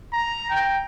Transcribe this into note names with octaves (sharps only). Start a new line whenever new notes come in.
A#5
G5